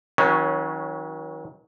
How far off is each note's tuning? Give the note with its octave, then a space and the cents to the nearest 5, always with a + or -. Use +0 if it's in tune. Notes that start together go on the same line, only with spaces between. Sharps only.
D#3 +45 F#3 +0 C#4 -5